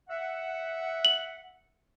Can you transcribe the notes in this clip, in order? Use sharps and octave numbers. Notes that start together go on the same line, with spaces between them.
E5 F#5
F#7